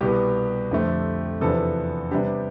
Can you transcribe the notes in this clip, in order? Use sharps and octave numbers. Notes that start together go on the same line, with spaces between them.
C2 B2 B3 G4
F2 D3 A3 C4
E2 C3 F3 B3 D4 A4
C3 G3 B3 D4 G4